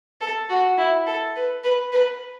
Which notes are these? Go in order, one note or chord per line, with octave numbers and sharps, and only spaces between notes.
A4
F#4
E4
A4
B4
B4
B4